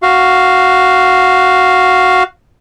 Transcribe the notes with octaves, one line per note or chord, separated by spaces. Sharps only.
F#4 F5